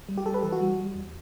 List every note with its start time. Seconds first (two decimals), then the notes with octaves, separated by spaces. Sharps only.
0.09 G3
0.18 G4
0.26 G3 A4
0.34 B4
0.43 E3 A4
0.52 F#4
0.61 G3
0.78 G3
0.96 E2